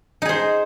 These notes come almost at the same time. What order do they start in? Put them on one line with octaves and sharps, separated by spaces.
D#4 G#4 C5